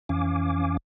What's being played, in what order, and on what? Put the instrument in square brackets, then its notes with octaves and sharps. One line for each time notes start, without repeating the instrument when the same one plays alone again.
[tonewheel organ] F2 E3 C#4 F5 G#5 D6